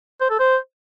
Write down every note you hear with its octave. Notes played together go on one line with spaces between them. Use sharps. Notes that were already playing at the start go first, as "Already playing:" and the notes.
C5
A4
C5